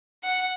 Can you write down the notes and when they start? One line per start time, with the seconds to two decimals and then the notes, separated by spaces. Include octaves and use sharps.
0.24 F#5